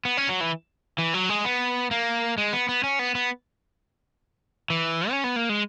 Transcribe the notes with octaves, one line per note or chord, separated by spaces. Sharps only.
B3
C#4
F#3
E3
E3
F#3
G#3
B3
A#3
G#3
B3
B3
C#4
B3
B3
E3
C#4
B3
A#3
G#3